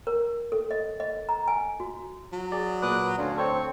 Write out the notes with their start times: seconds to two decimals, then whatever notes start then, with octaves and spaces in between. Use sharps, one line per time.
0.07 A#4
0.52 A4
0.71 D#5
1.00 D#5
1.29 A#5
1.48 G#5
1.80 F#4
2.32 F#3
2.52 G#4 D5
2.82 A#2 B4 D6 D#6 F#6
3.18 D2 C#4 D4 F4
3.38 C4 A4 C5 C#5 C#6